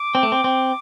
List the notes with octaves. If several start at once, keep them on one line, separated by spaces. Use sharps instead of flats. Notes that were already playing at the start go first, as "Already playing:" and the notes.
Already playing: D6
C4
A3
C4
C4